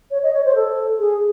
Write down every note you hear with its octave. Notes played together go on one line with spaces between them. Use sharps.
C#5
D#5
C#5
C5
A4
G#4